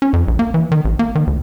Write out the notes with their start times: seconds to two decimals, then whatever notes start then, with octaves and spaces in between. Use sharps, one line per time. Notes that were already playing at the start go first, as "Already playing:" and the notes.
0.02 C#4
0.13 F2
0.28 A#1
0.39 A#3
0.54 E3
0.72 D#3
0.85 A1
0.99 A#3
1.15 D#3
1.27 D2